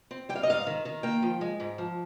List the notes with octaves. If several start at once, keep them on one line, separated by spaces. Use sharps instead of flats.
C4
G3 G5
F5
D#5
G#2 F5
D#3
D#3
A#3 G5
F3
G#3
G#2
F3